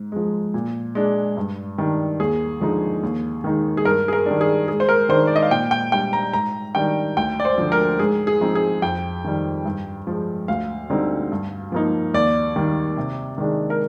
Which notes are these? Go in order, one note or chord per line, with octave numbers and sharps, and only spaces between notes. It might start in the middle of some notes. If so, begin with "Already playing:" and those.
Already playing: G#2
F3 G#3
A#2
G#3 D4
G2
D#3 G3 D4
D#2 G#4
D3 F3 G#3 D#4
D#2
D#3 G#3 D#4
G#4
G2 A#4
G#4
A#4
D#3 G3 D4
G#4
G#2 G#4
C5
A#4
D#3 G#3 D4 C5
D5
D#5
F5
A#2 G5
G5
G3 D4 G5
A#5
G#2 A#5
D#3 G3 D4 G5
D2 G5
D5
C5
D3 F3
A#4
G#2 G#4
G#4
F3 C4 D#4
G#4
F2 G5
D#3 G3
G2
F3 G#3
D2 F5
D3 G3 C4 D#4
G2
F3 A#3 D#4
D#2 D5
D#3 G3
C3
D#3 G#3 D4
A#4